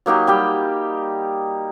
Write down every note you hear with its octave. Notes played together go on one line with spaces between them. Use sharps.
F#3 A#3 D#4 G4
G3 G4 G5